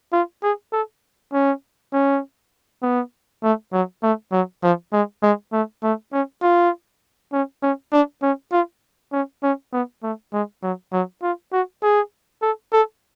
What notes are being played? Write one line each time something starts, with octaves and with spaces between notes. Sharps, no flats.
F4
G#4
A4
C#4
C#4
B3
A3
F#3
A3
F#3
F3
G#3
G#3
A3
A3
C#4
F4
C#4
C#4
D4
C#4
F4
C#4
C#4
B3
A3
G#3
F#3
F#3
F4
F#4
G#4
A4
A4